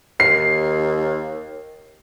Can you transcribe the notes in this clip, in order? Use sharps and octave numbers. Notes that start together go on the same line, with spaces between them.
D#2 C7